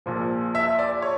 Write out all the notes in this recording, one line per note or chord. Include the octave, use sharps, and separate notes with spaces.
A#1 A#2 F3
E5
D5
C#5